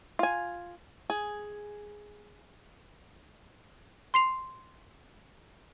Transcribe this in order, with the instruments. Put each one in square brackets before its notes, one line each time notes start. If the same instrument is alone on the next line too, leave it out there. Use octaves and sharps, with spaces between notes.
[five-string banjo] F4 G#5
G#4
[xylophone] C6 C7 F7